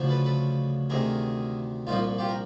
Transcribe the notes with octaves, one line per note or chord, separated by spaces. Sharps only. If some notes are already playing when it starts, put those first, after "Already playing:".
Already playing: D2 C#3 F3
A4 B4
A4 B4
D2 C3 D#3 G#4 A#4
C2 A#2 F3 D#4 F4
F4 G4
A#4